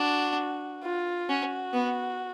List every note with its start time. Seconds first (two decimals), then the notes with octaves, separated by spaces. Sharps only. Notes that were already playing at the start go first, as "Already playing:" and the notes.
Already playing: D4 F#4
0.84 F4
1.29 C#4 F#4
1.73 B3